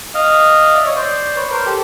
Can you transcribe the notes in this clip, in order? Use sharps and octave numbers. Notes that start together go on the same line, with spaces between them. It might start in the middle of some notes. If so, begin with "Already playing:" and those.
D#5 F5
D5 E5
C#5 D#5
C5 D5
B4 C#5
A#4 C5
G4 A4